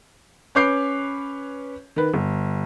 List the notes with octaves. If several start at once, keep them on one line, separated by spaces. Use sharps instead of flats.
C#4 B4 C#5 D6 G6 C7
D#3 B4
G1